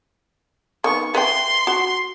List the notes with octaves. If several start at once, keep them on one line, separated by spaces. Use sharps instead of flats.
D#3 A3 B3 C#6
B4 E5 G5 C6
F#4